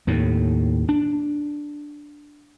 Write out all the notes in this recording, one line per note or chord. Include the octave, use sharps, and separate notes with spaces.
D#2 A2
D4